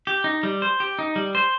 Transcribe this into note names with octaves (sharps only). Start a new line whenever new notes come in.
G4
D#4
G3
C5
G4
D#4
G3
C5